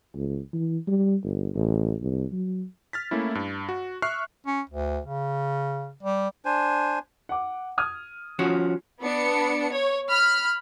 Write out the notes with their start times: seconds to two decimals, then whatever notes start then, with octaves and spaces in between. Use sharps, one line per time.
0.15 C#2
0.53 E3
0.87 G3
1.24 G1
1.55 A1
2.01 C2
2.32 F#3
2.93 F6 A6 B6
3.11 A3 A#3 C#4 E4
3.35 G2
3.69 F#4
4.02 E5 C#6 F6 F#6 C7
4.47 C#4
4.70 D2
5.06 C#3
6.03 G3
6.45 D4 C5 G#5
7.29 F#5 D6
7.78 D#6 F6 G#6
8.39 F3 C#4 F#4
9.01 B3 D4 C#7
9.71 C#5
10.09 B5 F6